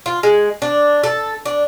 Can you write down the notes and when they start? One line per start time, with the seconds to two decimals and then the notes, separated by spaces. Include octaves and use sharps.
0.06 F4
0.23 G#3
0.62 D4
1.03 A4
1.46 D4